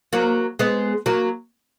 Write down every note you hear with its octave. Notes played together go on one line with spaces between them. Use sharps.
F#3 A#3
G#3 B3
F#3 A#3